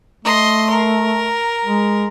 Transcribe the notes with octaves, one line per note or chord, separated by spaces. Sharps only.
A3 D#5 C6
A#4
G#3